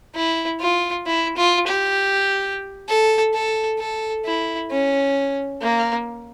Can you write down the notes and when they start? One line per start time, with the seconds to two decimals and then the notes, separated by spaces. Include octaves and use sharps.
0.15 E4
0.60 F4
1.06 E4
1.37 F4
1.67 G4
2.88 A4
3.34 A4
3.79 A4
4.25 E4
4.71 C#4
5.62 A#3